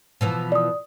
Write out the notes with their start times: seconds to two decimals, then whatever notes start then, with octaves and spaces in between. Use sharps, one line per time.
0.21 B2 E3 F3
0.52 D5 D#6